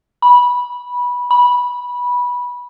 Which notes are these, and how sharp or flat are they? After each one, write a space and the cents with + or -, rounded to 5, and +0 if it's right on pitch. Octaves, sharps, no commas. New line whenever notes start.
B5 -15
B5 -15